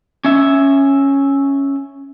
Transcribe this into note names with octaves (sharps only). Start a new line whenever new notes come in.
C#4 E5